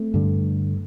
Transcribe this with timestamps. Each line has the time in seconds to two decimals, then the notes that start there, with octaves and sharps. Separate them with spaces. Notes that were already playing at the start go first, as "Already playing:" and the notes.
Already playing: A3 C4
0.14 G2 D3